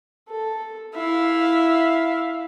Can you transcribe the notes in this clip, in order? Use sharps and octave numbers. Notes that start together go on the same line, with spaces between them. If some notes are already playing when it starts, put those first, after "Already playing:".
A4
E4 E5 F5